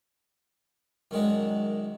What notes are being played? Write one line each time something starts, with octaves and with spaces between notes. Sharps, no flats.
F#2 D#3 G#3 D4